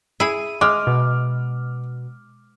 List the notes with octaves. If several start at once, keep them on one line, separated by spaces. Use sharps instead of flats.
E4 G#4 D#7
G#3 D6 F6
B2